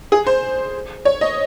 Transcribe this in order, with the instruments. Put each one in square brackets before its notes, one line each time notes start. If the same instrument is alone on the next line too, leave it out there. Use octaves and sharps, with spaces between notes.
[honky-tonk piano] G#4
C5
C#5
D#5